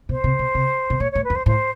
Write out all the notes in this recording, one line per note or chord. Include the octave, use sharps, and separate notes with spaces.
B2 C5
C3
B2
C3
B2
A#2 C#5
A2 C#5
B4
F2
C5
A2 C5